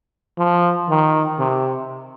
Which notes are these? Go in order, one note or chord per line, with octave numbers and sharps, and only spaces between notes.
F3
D#3
C3